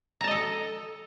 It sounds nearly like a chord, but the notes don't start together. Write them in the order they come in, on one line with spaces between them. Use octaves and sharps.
A#5 A5 D#5 A4